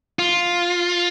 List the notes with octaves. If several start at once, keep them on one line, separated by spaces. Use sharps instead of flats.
F4